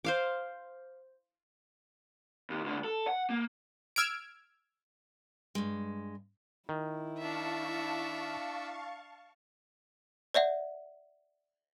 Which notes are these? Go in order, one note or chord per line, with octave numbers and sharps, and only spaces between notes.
C5 F5 D6
D#2
C#2 D3
A4
F#5
A#3
E6 F6 G#6 D7
G2 G#3
D#3 E4
D4 E5 F5 A5 C#6
C#5 D5 E5 F#5